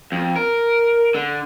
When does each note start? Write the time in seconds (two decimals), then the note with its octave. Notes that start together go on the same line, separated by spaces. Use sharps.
0.12 F2
0.36 A#4
1.15 D3